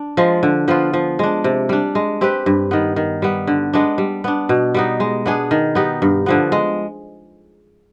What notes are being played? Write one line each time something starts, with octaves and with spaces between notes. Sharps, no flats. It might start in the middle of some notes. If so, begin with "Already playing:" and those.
Already playing: D4
F3 G#3
D3
F3 B3 F4
F3
G#3 D4
C3
G3 D4
G#3
C4 G4 B4
G2
D#3 B3
D#3
G3 B3
D3
G#3 B3 D4
G3
B3 D4
B2
G3 B3 D#4
G#3
B3 D4 G#4
D#3
B3 D#4 G4
G2
D3 F3 B3
G#3